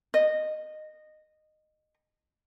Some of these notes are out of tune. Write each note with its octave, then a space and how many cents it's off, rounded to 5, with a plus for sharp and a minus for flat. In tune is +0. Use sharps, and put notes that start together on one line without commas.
D#5 -15